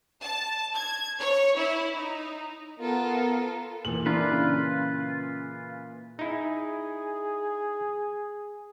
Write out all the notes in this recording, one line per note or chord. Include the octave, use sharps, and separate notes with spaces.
A5
G#6
C#5
E4
D#4
B3 F4 A4 A#4
A#2 E3 F#7
D4 E4 F4 A#4 B4
C#3
D#4 E4 G#4